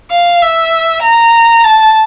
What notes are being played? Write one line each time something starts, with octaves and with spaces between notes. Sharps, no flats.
F5
E5
A#5
A5